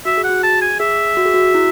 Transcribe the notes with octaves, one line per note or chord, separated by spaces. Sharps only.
F#4 E5
G#4
F#5
F#4
G#4 A5
G#5
G#4 E5
F#4
G#4
F#4
E4